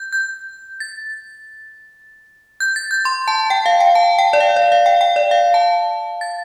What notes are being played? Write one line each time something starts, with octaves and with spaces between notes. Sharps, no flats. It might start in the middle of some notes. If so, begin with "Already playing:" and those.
Already playing: G6
G6
A6
G6
A6
G6
C6
A5
G5
F5
G5
A5
G5
D5
F5
D5
F5
G5
G5
D5
F5
A5
A6